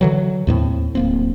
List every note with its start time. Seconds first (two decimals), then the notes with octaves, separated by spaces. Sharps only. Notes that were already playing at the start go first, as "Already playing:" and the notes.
0.01 D3 E3 F#3
0.47 D#2 A2 A#3 C4
0.95 D1 A#3 C4